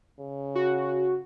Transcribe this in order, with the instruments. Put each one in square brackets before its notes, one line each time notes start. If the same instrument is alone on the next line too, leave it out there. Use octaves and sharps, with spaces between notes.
[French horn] C#3
[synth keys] F#4